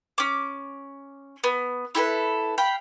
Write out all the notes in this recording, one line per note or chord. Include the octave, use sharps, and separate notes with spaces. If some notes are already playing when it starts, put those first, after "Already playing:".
C#4 D6
B3
E4 G4 A4 B4
F5 G5 B5